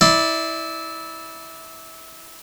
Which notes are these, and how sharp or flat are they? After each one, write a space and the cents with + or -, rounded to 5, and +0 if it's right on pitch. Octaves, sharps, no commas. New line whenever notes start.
E4 -20 D5 +0 C6 +0